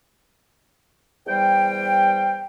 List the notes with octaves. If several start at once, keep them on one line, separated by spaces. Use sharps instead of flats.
E2 G3 C5 G5